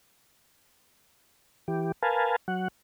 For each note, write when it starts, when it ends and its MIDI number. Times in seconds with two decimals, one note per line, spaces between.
1.68 1.92 52
1.68 1.92 67
2.02 2.36 70
2.02 2.36 71
2.02 2.36 77
2.02 2.36 80
2.02 2.36 81
2.48 2.68 54
2.48 2.68 78